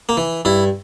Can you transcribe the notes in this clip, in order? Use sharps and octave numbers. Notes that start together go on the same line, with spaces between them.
A#3
E3
G2 E4